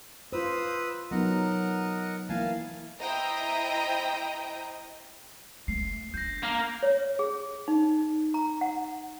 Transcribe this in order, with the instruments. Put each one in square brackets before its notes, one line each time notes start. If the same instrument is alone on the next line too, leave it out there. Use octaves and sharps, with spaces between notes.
[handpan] F4 C5 [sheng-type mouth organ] B4 D#6 E6
[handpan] F#3 B3 D#4 [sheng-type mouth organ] A#4 D#5 F#5
[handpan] E3 A#3 E4 [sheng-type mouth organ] F5 G#5 A5
[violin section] E4 C5 D#5 G5 A#5 D#6
[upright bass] A3 [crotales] C7
[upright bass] D4 [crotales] G6 A#6
[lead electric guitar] A#3 A#4
[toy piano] C#5
G#4
D#4
A#5
F#5